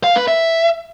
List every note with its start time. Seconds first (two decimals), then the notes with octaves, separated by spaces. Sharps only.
0.04 F5
0.16 B4
0.28 E5